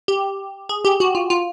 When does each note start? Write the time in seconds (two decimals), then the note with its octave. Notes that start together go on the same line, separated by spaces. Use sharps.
0.08 G4
0.69 G#4
0.85 G4
1.00 F#4
1.15 F4
1.30 F4